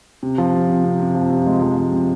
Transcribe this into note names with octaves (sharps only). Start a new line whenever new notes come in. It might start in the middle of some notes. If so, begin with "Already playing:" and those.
C3
F3
C3
C3
C3
C3
F3
C3
G#3
F3
G#3
C3